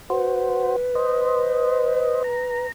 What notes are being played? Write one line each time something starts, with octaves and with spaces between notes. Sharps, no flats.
F#4 B4 C5
C5 D#5
A#5